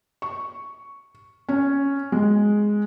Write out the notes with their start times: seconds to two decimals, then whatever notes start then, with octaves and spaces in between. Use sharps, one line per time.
0.22 C#6
1.49 C#4
2.12 G#3